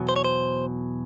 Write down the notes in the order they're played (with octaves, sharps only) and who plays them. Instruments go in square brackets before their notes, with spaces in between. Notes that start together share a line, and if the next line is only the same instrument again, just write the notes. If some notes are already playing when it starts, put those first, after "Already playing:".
Already playing: [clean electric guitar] E2 B2 F#3
C5
C#5
C5